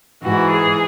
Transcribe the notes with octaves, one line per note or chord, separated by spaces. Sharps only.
G#2 E3 F#4
G#4